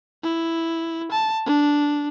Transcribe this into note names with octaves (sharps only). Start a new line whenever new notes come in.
E4
A5
D4